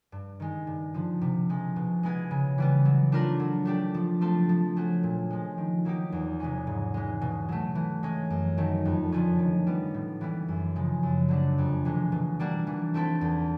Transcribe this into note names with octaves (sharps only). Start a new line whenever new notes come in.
G2
D#3 G#3
G2
D3 F3
C3
F3 G#3
B2
G#3 B3 E4 G#4
C#3
E3 G3 B3
F#3
A3 D4 F4 A#4
F#3
A3 D4 G4
F3
A3 C4 F4 A4
F3
A3 C#4 F#4
A#2
F3 G#3
D#3
F#3 A#3 D#4 G4
E2
C3 E3 G#3 C#4
G#2
E3 G#3
B2
F#3 A3
E3
G#3 C#4
F#2
D#3 F#3 A3
F2
D3 F3 A3 C#4
D#3
G3 B3
A2
E3 G3 B3 E4
F#2
C#3 F3 G#3
F#2
D3 F#3 A3 D4
F2
C3 E3 G#3
B2
G3 A#3 D4 F#4
E3
A3 C4 E4 A4
E2